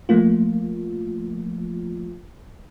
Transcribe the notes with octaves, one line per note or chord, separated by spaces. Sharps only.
F3 A3 A#3 F4